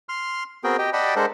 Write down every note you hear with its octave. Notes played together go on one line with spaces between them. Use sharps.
C6 F6
B3 C4 F#4 G#4 A#4 G5
G4 D#5 G5
D5 D#5 F#5 G5 A5 B5
G#3 D4 A4 A#4 C5 F#5